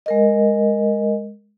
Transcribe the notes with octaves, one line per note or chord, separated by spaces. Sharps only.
G#3 A#4 D#5